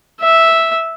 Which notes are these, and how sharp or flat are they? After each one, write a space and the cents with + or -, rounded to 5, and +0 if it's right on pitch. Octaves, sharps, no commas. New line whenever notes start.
E5 -5